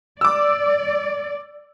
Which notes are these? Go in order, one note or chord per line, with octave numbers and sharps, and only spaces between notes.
D5 D6 E6